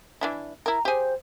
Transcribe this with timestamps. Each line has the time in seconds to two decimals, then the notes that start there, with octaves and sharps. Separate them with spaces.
0.21 E3 D4 E4
0.66 E4 A#4 A#5
0.85 G4 G#4 C5